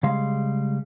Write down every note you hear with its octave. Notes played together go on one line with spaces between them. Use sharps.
C#3 G3 G#3 G#4 F5 C6